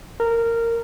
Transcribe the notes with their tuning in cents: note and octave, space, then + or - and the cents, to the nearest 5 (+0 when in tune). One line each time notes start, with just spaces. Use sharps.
A#4 -15